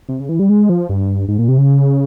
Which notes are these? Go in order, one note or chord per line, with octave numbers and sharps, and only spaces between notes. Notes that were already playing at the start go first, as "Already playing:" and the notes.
C3
C#3
E3
G3
G#3
F3
G2
G#2
A#2
C3
C#3